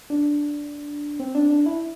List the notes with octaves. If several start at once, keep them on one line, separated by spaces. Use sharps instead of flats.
D4
C4
D4
D4
E4